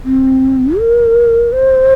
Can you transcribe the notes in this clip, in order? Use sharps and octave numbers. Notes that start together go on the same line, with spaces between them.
C4
A#4
C5